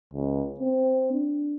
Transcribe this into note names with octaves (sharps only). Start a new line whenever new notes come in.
C#2
C4
D4